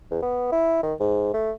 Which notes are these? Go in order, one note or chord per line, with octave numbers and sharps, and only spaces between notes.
E2
B3
E4
D#3
G#2
A3